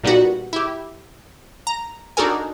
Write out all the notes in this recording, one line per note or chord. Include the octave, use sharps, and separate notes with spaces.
A#2 G3 B3 D#4 F#4
E4 G4
A#5
D4 D#4 F#4 A4 A#4 G#5